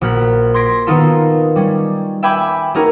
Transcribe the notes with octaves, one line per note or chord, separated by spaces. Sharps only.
A#1 F#4 F6 F#6 B6
C6 G#6 A#6 B6 D7
D#3 B3 D#4 F4 F#4 A4
G3 C#4
E5 G5 G#5 B5 D6
A3 C#4 D#4 F#4 G#4 A#4